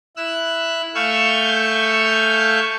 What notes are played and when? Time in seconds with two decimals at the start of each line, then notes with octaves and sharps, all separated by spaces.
0.17 E4 E6 F#6
0.95 A3 F5 G#5 C#6 E6 G6